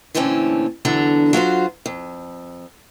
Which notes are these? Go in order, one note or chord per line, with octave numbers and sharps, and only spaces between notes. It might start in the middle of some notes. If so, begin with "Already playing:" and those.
A#2 D3 E3 A3 C4 C#4
E2 D3 F#3 D4 A4 A#5
F#3 F4 F#4 C5
F2